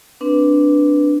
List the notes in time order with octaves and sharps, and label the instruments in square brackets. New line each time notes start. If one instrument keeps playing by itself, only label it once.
[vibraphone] C4 D4 B4